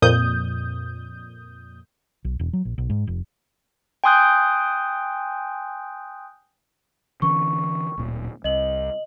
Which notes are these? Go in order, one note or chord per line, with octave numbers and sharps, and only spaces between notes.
F2 A#2 D#6 G6
B1
E1
F#3
A#1
B1
G#2
F1
G5 G#5 C6 D#6 F#6 G6
D3 E3 C#4 C#6
D1 A#2
C2 D#5 F#7